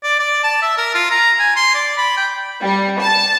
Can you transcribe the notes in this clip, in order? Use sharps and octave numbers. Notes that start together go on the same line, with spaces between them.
D5
D5
A5
E5
A#4
F4
A#5
G#5
C6
D5
B5
G5
G3
A5